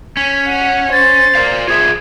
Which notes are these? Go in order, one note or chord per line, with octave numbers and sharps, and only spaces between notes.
C#4 B6
F#5
C5 A6
A#4 D5 F5
F4 G#4 E5 G#6